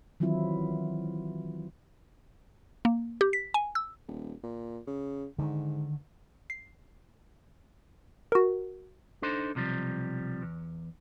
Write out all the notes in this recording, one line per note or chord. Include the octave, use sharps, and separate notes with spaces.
D#3 E3 F#3 C4 E4 F4
A#3
G4
B6
G#5
E6
D#1
A#2
C#3
G#2 D3 D#3
C7
F#4 A#4
D4 D#4 A4 C5
B1 C3 F3 G3
E2